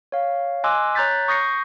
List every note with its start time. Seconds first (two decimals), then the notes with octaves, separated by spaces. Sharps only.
0.12 C#5 F5
0.64 D#5 G#5 C6 D6 E6 F#6
0.95 C#5 A#5 F#6 G6 A6 B6
1.28 C#6 D#6 G6 A#6 C7 C#7